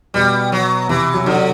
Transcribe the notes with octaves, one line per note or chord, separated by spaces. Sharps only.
B2 G3
F#3
C3 E3
F#3
D3 F#3